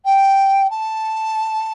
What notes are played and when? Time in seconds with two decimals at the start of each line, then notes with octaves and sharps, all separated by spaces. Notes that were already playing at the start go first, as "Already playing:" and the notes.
0.05 G5
0.70 A5